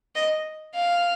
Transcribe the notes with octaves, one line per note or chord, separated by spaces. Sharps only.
D#5
F5